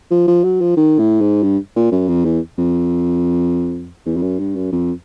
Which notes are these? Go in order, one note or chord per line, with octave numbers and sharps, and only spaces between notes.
F3
F3
F#3
F3
D#3
A2
G#2
G2
A#2
F#2
F2
E2
F2
E2
F2
F#2
G2
F#2
F2